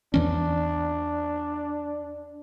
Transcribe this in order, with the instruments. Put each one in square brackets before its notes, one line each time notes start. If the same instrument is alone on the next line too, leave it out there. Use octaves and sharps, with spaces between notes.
[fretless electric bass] E2 E3 C#4 [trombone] D4